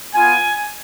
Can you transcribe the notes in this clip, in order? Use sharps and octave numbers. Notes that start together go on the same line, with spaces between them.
B3 F4 G#5